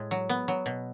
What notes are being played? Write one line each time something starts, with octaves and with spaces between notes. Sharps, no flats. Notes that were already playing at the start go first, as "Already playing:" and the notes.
Already playing: A2 G#3
F#3
B3
F#3
B2